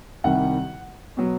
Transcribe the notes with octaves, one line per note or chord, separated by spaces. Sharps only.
C2 C3 D#3 G3 F#5
B2 F#3